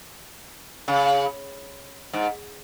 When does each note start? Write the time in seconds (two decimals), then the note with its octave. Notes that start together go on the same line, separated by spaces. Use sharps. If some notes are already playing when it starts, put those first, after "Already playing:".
0.88 C#3
2.13 G#2